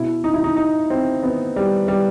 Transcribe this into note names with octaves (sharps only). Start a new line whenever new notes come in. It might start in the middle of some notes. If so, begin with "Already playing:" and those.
Already playing: B2 E4
D#4
E4
D#4
D#4
C4
B3
G3
G3